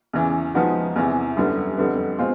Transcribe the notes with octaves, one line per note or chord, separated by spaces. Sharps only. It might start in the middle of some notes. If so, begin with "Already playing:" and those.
E2 C#3 E3
F3 G#3 B3 D#4 F#4
E2 C3 E3
F#2 D3 G3 B3
F2 D3 G3 B3
B2 G#3 C4 F4